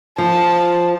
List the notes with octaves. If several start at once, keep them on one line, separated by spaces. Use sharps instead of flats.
F3 A5